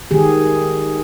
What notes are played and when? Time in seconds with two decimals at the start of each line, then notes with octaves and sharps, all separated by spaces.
0.11 D#3 G4 G#4